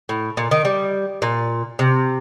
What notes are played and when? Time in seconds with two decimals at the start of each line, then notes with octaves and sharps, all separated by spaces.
0.09 A2
0.37 A#2
0.51 D#3
0.65 G3
1.22 A#2
1.79 C3